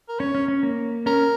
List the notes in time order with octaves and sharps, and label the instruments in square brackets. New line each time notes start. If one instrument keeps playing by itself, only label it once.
[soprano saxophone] A#4
[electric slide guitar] C#4 [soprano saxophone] C#5
[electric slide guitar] C#4
C#4
A#3
[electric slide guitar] C#4 [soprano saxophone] A#4